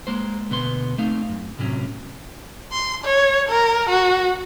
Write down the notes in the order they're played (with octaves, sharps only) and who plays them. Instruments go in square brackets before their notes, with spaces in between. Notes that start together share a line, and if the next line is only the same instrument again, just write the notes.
[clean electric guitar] G#3 A#3 C5
D2 B2 B3 C6
A3 C4 D#4 F5
F#2
A2 C3 F#3 C#4
[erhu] C6
C#5
A#4
F#4